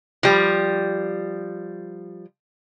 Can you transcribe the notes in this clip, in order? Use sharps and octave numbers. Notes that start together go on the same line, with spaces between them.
F3 G3